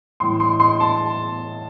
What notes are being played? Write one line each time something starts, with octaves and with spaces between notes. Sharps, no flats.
A2 E3 C6
C6
C6
A5